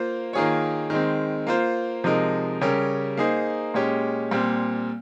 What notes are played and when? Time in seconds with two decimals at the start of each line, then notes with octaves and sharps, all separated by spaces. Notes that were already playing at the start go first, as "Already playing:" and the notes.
Already playing: A#3 F4 C5
0.33 D#3 A#3 F4 G#4 C#5
0.90 D#3 G#3 C4
1.47 A#3 F4 C5
2.04 C3 F3 G#3 D#4 A#4
2.61 C#3 G3 C#4 G4 A#4
3.17 A#3 D#4 G#4 C5
3.74 A#2 G#3 C#4 G4
4.31 A#2 G3 C4